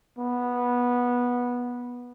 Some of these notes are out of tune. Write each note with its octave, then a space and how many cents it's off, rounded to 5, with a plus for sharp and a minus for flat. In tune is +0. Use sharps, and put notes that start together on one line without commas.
B3 -15